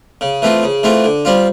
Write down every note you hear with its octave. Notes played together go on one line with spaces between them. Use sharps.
C#3
E3 A3 C4 F4
C#3
E3 A3 C4 F4
D3
G3 C4 F4